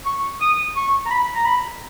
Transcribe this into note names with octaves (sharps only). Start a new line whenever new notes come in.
C#6
D#6
C#6
A#5
B5
A#5
B5